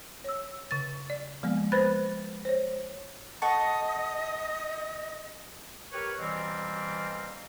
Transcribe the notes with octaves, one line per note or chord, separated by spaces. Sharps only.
C#5 E6
C#3 A6
D5
F3 G#3 A#3 B3
B4 C5 B5 F#6 A6
C5 C#5
A4 D#5 F#5 C#6
G4 A#4 B4 C#5
B2 E3 G3 A#3 C4